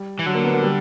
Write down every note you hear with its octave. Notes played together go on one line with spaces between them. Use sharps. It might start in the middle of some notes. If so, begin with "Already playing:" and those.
Already playing: G3
E3
D3 F#3
A#3
B3
A#3
G3